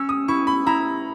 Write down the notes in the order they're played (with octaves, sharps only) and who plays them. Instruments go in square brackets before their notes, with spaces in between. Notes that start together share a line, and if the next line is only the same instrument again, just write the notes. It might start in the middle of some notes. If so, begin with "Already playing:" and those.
Already playing: [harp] C#4 [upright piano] E6
[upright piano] D#6
[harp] E4 [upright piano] C#6
[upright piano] B5
[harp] E4 [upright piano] A#5